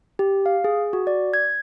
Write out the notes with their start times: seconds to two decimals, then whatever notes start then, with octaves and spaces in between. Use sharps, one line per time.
0.19 G4
0.46 F5
0.64 G#4
0.93 F#4
1.07 D5
1.34 G#6